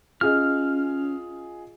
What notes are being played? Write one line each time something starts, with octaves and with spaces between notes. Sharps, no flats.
C#4 F4 G#4 D#5 F6